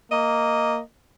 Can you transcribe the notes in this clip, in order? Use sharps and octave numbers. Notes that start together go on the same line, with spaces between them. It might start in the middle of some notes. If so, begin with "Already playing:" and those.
A#3 D#5